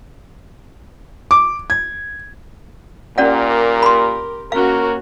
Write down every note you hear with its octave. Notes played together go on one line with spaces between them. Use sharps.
D6
G#6
A#2 C#4 G4 A#4 D5 F#5
B5 C6
A#3 C#4 F#4 A#4 F5